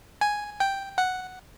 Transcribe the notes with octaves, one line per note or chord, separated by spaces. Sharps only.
G#5
G5
F#5